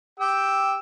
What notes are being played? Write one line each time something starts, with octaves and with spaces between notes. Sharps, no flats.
G4 G5 E6